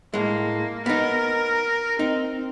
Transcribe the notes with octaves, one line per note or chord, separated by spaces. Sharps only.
A2 G#3 A#3
B3 D#4 A#4
C4 D#4